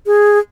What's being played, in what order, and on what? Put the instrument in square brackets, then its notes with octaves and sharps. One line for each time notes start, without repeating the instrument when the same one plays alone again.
[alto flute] G#4